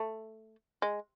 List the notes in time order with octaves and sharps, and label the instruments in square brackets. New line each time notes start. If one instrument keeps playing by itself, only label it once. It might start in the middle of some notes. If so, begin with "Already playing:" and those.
Already playing: [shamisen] A3
G#3